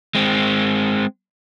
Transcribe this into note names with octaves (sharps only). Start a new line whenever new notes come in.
G#3 C4